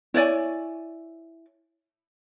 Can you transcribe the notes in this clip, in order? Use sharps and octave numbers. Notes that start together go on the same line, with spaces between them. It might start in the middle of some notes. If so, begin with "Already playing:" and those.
E4 C#5 D5 G#5